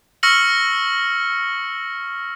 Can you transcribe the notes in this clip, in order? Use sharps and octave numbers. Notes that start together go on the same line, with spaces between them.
C#6 E6 F6 A#6 C#7 F#7